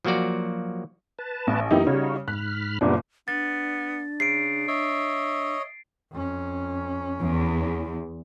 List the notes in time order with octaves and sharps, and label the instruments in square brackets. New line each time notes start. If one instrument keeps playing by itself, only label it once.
[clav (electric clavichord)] F3 F#3 A#3 F#4 D5
[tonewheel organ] B4 A5
[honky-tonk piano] A1
[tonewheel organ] F#2 E3 A#3 [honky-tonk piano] D#4 E4 G4
[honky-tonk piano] C#3 G3 [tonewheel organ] D#4 F#4 C#5
[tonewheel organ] G#2 B5 F6 [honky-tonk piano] F#6
[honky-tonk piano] F#1 A#2 D4 [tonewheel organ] G3 B3
[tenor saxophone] B3 [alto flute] D4 [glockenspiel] A6
[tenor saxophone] C#3 [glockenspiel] C7 D7
[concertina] C#5 D#5 [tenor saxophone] E5
[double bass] F2 C#4
[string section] E2